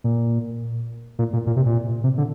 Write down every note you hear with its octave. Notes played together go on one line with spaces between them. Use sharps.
A#2
A#2
A#2
A#2
C3
A#2
C3
D3